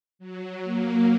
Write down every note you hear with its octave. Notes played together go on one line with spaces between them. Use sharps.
F#3
A#3